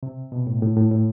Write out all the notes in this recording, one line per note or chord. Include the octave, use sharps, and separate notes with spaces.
C3
B2
A2
A2
A2
A2